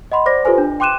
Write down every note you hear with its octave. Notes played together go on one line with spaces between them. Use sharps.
D#5 F#5 B5 C6
C5 D5 D6 A#6
F4 G4 A4 B4 C5 G#5
D4
G5 C6 D6 F#6 D#7 E7